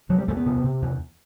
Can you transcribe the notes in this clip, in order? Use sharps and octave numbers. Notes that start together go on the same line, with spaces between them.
C3 F#3
G3
E2 A3
B3
C3
C3
E2